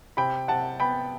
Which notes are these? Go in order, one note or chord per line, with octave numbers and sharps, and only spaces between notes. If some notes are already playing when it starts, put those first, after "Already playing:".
C3 G5 B5
C3 F#5 A5
B3 G5 B5